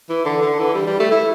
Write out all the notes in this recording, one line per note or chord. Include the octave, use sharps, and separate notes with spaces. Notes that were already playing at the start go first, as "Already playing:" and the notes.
E3
D3
D3
E3
G3
G3
A3
E4